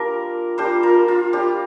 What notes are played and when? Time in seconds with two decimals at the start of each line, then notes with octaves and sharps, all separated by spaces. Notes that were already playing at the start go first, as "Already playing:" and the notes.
Already playing: G3 A#3 D4 F4 G4 A#4
0.58 G3 A#3 D4 F4 G4 C5
0.83 F4 A#4
1.08 F4
1.33 G3 D4 F4 G4